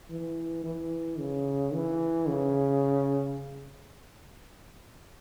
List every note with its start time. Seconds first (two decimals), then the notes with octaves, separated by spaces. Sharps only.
0.10 E3
0.64 E3
1.19 C#3
1.73 E3
2.28 C#3